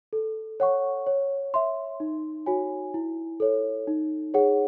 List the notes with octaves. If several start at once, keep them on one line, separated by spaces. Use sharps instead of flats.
A4
C#5 F#5 C#6
C#5
E5 C6
D#4
F#4 C#5 G#5
E4
A4 C#5
D#4
G#4 C#5 F#5